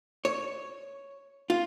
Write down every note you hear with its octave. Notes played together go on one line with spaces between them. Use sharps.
C#5
F4